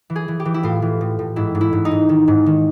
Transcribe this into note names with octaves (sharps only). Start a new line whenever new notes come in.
E3
G#4
E3
G4
E3
E4
A2 F4
E3
A2
A2
G#2 E4
G#2
E4
G#2
D#4
G#2
D#3
G#2
D#3